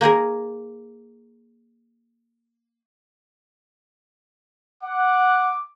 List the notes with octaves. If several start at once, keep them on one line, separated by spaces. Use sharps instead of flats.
A#3 D#4 G#4 A#4
F#5 D6